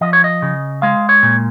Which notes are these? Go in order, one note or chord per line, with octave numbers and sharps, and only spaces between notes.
F3 D#5
C#5
D#5
C#3
G#3 F5
C#5
A#2